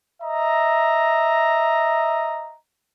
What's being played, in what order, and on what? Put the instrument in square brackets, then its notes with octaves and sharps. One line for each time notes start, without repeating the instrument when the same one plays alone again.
[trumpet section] D#5 E5 A#5